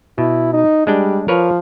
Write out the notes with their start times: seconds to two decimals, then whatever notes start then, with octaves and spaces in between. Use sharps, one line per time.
0.18 B2 E4
0.54 D#4
0.87 G3 G#3 D4 G5
1.28 F3 A#4 B4 C#5